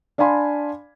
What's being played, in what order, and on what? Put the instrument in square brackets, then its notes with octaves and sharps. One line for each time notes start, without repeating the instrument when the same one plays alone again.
[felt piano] D4 D5 F5 G#5 B5 C6